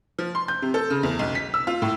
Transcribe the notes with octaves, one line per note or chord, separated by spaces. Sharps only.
F3
C6
G6
C3
A4
C#3
E2
B1
B6
E6
F4
A2